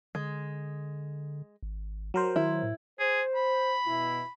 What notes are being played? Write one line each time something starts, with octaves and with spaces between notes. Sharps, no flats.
D3 G#3
G#1
F#3 A#4 C5
D#3 E4
A2
G#4 C5
B5
B2 E4